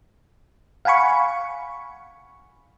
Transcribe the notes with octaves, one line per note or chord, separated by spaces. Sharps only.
F5 F#5 G#5 B5 C#6